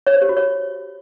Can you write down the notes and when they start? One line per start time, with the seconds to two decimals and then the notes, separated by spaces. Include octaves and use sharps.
0.07 C#5
0.14 C5
0.22 G4
0.29 F#4
0.37 C#5